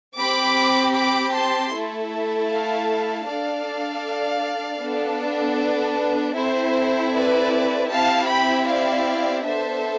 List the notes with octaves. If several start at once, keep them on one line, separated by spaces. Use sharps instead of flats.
C4 G4 B5 D6
B5 D6
A5 C6
A3 E4 A4
F5 A5
D4 A4 D5 F5
B3 D4 A4
B4
C4 E4 A4 C5
B4 D5
C4 E4 G4 F5 A5
G5 B5
D5 F5
B3 D4 A4 C5 E5